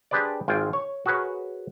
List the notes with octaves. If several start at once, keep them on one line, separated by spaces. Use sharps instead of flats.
D4 G4 G#4 B4 C5 D5
G#1 F4 G5 G#5
C#5
F#4 G#4 A#4 B4 C#5